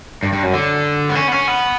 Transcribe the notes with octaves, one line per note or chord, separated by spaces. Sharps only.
G2
G2
F#2
D3
B3
C#4
B3
C#4
B3